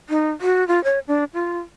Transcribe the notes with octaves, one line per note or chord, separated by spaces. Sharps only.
D#4
F#4
F4
C#5
D4
F4